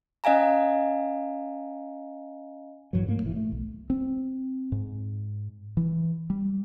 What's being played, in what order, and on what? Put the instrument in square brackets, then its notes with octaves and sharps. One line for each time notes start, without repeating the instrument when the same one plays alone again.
[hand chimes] C#4 D#5 F5 G#5 A#5
[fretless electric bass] A1 G2 E3 F#3
G#2 A3 A#3
F1 E3
A2 A3
B1
[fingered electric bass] C4
G#2
E3
G3